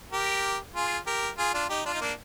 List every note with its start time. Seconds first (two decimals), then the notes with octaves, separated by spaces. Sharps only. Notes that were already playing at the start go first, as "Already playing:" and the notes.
0.12 G4 A#4
0.75 F4 G#4
1.06 G4 A#4
1.38 F4 G#4
1.54 D4 F4
1.70 D#4 G4
1.86 D4 F4
1.94 D#4
2.01 A#3 D4